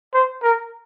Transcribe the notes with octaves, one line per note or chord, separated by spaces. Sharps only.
C5
A#4